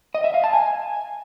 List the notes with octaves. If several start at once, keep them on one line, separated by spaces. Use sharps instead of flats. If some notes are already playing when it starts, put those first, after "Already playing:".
D#5
E5
F5
A5
G#5